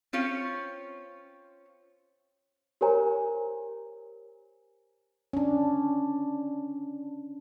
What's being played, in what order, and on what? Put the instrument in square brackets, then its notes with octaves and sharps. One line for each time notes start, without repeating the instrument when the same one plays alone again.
[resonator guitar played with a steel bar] C4 C#4 F4 C#5
[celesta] G4 A#4 C5 C#5 G#5 A#5
[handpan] C#4 D4